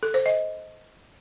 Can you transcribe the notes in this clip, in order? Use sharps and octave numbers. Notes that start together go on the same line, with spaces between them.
A4
C5
D#5